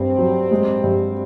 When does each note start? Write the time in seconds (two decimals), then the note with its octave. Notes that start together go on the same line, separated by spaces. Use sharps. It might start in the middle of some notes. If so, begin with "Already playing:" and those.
Already playing: G2 C4
0.18 F#3
0.51 G#3
0.84 G2